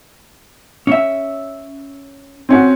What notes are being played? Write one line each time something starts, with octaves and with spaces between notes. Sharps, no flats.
C#4 E5
C4 C#4 F#4